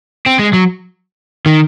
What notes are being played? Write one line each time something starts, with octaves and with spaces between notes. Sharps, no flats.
C4
G#3
F#3
D#3